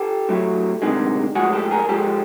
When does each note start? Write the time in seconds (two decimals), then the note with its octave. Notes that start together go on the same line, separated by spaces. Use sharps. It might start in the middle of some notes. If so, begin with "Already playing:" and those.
Already playing: G4 A4
0.29 A2 F#3 A3
0.82 D2 C3 D#3 G#3
1.35 A2 F3 G#3 F#4 G#4
1.53 G4 A4
1.71 G#4 A#4
1.88 G#2 F3 G#3 G4 A4